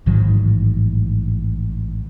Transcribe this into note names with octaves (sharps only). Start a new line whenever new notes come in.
A1 G#2 D#3 F#3